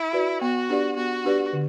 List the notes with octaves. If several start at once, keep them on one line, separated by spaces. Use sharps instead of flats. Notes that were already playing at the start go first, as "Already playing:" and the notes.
Already playing: E4
F#4 B4 D5
B3 F#4
D4 G4 B4 D5
B3 F#4
D4 G4 B4 D5
D3